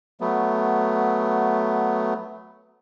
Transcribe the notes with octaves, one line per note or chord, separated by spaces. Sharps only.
F#3 A3 B3